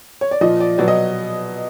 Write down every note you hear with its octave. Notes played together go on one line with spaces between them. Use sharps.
C#5
D5
A#2 F3 D#5
D5
B2 F#3 D5
D#5